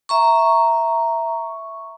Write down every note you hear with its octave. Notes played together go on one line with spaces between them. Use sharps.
E5 A#5 C#6